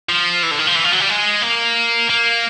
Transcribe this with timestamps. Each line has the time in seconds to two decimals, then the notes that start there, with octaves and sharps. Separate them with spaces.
0.09 F3
0.43 E3
0.51 D3
0.59 D#3
0.67 F3
0.75 E3
0.84 F3
0.92 F#3
1.00 G3
1.09 G#3
1.42 A#3
2.09 A#3